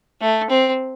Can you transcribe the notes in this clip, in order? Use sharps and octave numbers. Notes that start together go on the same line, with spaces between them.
A3
C4